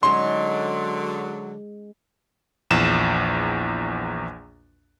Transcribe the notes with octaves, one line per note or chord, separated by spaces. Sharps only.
D3 F#3 G#3 C#4 D#4 C6
A#1 E2 E7